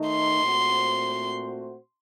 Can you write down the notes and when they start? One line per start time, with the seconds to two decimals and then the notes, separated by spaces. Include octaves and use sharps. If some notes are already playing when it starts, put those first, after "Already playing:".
Already playing: D#3 A3 D#4
0.08 C6
0.42 A#2 A3 C4 F#4 C5